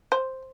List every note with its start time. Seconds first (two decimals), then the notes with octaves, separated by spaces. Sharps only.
0.12 C5